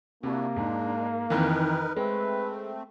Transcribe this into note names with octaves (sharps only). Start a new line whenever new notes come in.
C3 A#3 D4 E4 F#4
G#2 G#3 D4
F2 D#3 E3 D#4 A#4 B4
G#3 A3 C4 B4